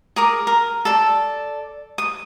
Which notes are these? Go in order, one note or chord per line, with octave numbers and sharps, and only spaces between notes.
G#4 A#4 D6
A#4
A4 D5
D#6